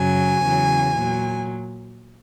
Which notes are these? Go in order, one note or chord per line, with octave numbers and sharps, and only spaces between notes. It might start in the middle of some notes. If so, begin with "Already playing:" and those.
Already playing: F#2 C#3 F#3 G#5
E2 C#3 F#3
A#2 F#3